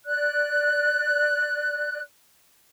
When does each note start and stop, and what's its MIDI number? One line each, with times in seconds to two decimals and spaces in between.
0.05 2.00 74
0.05 2.00 90